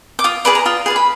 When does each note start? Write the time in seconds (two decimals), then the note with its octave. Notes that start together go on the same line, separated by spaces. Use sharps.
0.19 D6
0.24 F4 D#6
0.45 G#4 B4 D5 B5
0.55 A#5
0.66 F4 D#6
0.86 G#4 B4 D5
0.96 B5